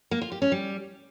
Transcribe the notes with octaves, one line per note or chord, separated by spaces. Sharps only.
A#3
F4
G4
C#4
G3